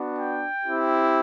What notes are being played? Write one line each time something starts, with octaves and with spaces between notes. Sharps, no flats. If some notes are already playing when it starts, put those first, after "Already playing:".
Already playing: B3 D4 F#4
G5
C4 E4 G4